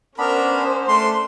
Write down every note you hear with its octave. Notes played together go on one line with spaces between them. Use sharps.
B3 C#4 D4 A#4 C5 B5
A3 D4 C6